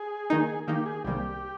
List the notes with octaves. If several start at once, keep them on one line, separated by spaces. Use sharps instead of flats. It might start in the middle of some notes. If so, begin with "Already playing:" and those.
Already playing: G#4
D#3 A#3 D#4
D#3 A#3 D#4 G4
G#4
C2 C3 D#3 G3 A#3 G4